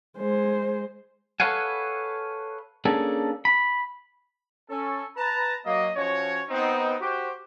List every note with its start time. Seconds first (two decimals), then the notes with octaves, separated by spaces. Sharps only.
0.18 G#3 C5
1.40 A4 B4 C#5 F5 F#5 G#5
2.85 A#3 C#4 D4 G#4 A4
3.45 B5
4.69 C#4 A4
5.16 B4 A5 A#5
5.66 F#3 A#3 D#5
5.96 F3 C#4 F#4 C#5
6.49 B3 C4 D#4
7.00 F#4 G4 C5